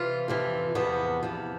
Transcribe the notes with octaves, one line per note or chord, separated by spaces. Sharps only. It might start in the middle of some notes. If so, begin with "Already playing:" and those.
Already playing: C3 E3 F4
F2 C3 E3
E2 C3 F3 B3
E2 C3 F3